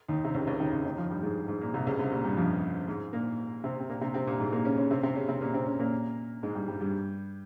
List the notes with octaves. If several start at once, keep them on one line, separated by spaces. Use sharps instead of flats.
D#2 D#3
C3
C#2 C#3
C#2 C#3
D#2 D#3
C#2 C#3
D#2 D#3
F2 F3
G2 G3
G#2 G#3
G#2
A#2
C2 C3
C#2 C#3
C2 C3
A#2
G2 G3
F2 F3
G#2 G#3
A#2 A#3
C3 C4
C4
A#2 A#3
C3 C4
C3 C4
A#2 A#3
G#2 G#3
A#2 A#3
C#3 C#4
C#3 C#4
C3 C4
C3 C4
C#3 C#4
C3 C4
A#2 A#3
C3 C4
C#3 C#4
A#2 A#3
G#2 G#3
G2 G3
G2 G3
G2 G3